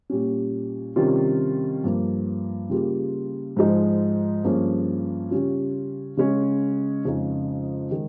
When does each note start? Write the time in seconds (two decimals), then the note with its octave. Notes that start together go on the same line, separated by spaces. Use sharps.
0.10 A#2 G3 C#4
0.96 C3 D#3 G3 C#4 F4
1.84 G2 F3 A#3
2.70 C#3 G3 A#3 F4 G#4
3.57 G#2 F3 G#3 D#4
4.44 G2 F3 A#3 C#4 G#4
5.31 C#3 G3 C#4 F4
6.17 C#3 G#3 C#4
7.05 F2 C#3 G#3 D#4
7.91 D#3 G#3